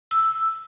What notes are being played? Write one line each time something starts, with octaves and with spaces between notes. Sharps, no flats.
E6